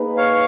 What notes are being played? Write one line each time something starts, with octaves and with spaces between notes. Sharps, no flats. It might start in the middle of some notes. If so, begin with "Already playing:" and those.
Already playing: A#3 D#4 G#4 B4
C#5 F5